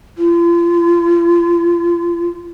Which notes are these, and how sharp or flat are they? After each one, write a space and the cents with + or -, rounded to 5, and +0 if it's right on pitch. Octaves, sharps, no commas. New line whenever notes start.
F4 -35